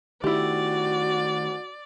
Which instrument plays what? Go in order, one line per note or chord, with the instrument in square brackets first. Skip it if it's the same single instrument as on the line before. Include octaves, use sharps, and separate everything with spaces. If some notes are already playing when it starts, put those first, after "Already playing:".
[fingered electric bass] D#3 A3 [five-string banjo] E4 G4 [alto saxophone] F#4 [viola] D5